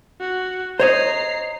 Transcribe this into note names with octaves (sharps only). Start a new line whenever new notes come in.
F#4
C5 C#5 D#5 A#5 C7